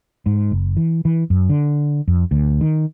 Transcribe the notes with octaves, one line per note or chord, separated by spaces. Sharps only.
G#2
F#1
E3
E3
F#2
D3
F2
D2
D#3